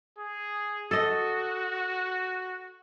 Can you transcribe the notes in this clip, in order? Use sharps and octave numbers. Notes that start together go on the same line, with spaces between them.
G#4
F#4 A4 D#5